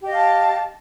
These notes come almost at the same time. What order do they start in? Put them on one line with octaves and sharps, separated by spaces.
G4 D#5 F5 A5